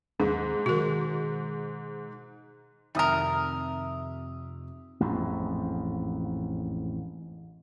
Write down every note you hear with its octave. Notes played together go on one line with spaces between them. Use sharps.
D#2 G#2 G#4
B2 D#3 F#4 A#4
F2 C3 D#3 G3 A#4 E5 G#5 D#6
A1 F2 G#2